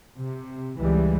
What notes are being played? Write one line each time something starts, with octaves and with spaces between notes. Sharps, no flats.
C3
C#2 E3 G3 G#3